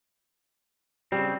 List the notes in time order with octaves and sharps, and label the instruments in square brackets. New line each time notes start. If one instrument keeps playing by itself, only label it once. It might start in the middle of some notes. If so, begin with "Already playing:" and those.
[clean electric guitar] C#3 C4 [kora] G3